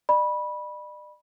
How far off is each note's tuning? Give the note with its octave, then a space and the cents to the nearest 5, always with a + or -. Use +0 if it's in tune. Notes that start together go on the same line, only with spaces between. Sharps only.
D5 +40 B5 -15